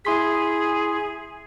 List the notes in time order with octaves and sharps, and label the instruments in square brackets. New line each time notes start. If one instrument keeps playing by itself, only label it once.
[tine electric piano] E4 C6 B6 [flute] G#4